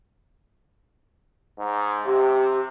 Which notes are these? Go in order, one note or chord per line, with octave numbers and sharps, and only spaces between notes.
G#2
C3 G4